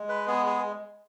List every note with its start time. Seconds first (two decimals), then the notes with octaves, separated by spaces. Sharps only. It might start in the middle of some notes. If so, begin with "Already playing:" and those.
Already playing: G#3
0.09 B4
0.27 B3 G#4
0.46 G#4